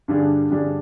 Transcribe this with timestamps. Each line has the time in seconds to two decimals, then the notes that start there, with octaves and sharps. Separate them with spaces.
0.08 G2 D3 G3 D4 G#4
0.50 G2 D3 G3 D4 G#4